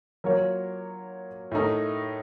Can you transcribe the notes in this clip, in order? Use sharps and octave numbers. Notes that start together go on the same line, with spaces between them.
F#3 A#3 F4 A#4 C#5
A2 A3 D#4 A#4